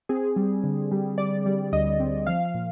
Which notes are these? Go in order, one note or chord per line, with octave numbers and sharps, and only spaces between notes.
C4 G#4
G3
D3
G3
G3 D5
G3
D2 D#5
C4
F3 F5
F5
A#2